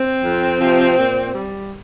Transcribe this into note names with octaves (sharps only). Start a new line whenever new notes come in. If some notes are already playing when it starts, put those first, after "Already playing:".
Already playing: C4
F2
C3 F3
A#2
G3